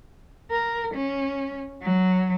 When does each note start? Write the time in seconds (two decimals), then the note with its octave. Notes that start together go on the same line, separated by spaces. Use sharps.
0.51 A#4
0.95 C#4
1.82 F#3